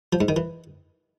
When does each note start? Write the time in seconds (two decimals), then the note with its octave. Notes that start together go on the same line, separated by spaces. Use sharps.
0.13 F3
0.21 G#2
0.28 D#3
0.36 E3